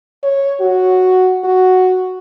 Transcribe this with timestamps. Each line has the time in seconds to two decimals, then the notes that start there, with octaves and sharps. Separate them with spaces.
0.23 C#5
0.61 F#4
1.44 F#4